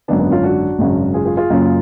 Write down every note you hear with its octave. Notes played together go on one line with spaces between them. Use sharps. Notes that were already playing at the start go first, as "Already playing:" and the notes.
G#1 F#2 D3 B3 D4
B3 D4
C#4 F4
D4 F#4
G#1 F#2 C#3
F4 G#4
F4 G#4
F4 G#4
F#1 F#2 C#3